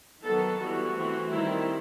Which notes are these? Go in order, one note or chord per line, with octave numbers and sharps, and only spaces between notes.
D#3 F#3 B3 A4
E3 G3 B3 F#4
E3 A3 C4
D#3 G3 C4 E4